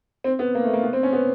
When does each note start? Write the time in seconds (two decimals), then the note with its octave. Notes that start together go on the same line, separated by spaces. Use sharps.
0.24 C4
0.39 B3
0.55 A#3
0.64 A3
0.73 A#3
0.83 B3
0.93 C4
1.03 C#4
1.13 B3